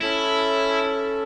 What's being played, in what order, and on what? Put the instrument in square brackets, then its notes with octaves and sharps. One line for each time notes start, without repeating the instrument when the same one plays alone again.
[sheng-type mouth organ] C#4 A4 [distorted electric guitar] E4